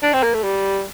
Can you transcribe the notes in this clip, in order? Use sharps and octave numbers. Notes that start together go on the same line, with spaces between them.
D4
C4
A#3
A3
G3